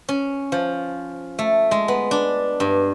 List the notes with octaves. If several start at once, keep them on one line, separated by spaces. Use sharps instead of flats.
C#4
F3
A3
G#3
B3
D4
G2